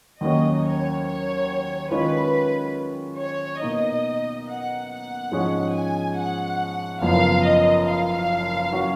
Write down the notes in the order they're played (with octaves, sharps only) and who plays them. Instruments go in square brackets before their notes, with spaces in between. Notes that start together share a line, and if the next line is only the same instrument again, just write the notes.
[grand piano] D#2 D#3 F#3 A#3 C#4 [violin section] D#5
[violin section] C#5
C#5
[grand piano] D#3 G#3 C#4 F4 [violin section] B4
[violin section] C#5
[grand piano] B2 A#3 D#4 [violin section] D#5
[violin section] F#5
F#5
[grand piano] G#2 F3 G#3 C#4 G#4
[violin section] G#5
F#5
[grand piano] F#1 F#2 F3 B3 [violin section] F5
[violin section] D#5
F5
[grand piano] F#3 C#4 F#4